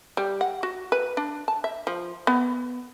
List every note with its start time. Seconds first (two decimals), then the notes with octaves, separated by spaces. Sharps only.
0.17 G3
0.41 F#5
0.63 F#4
0.92 B4
1.17 D4
1.48 A5
1.64 E5
1.87 F3
2.27 B3